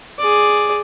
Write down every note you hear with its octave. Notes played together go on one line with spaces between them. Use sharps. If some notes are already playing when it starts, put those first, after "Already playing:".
G#4 D5